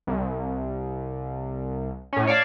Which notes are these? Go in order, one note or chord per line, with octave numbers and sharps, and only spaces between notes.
C2
A2 C#4
C#5 D5 F5 A5